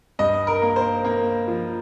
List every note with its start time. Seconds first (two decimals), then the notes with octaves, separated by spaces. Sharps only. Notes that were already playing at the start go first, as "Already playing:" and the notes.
0.19 G2 D#5
0.47 A#4
0.62 A#3
0.76 C5
1.04 A#3
1.47 F3